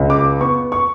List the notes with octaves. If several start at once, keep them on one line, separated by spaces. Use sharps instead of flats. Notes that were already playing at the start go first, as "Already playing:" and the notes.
Already playing: C#2
D6
B3 C#6
C#6